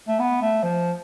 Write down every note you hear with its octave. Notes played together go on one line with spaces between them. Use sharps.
A3
B3
A3
F3